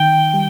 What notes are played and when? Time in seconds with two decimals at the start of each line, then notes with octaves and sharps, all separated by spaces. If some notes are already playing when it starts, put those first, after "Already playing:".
Already playing: D#3 G5
0.34 G3